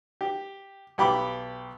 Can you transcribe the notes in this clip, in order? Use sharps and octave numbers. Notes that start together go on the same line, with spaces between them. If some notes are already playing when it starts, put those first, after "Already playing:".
G4
B1 G4 B5 D6